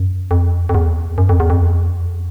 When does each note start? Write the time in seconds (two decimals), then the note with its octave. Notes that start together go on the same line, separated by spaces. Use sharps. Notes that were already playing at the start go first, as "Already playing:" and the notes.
Already playing: F#2
0.31 F2
0.69 F2
0.75 E2
1.18 F#2
1.29 F2
1.40 E2
1.50 F2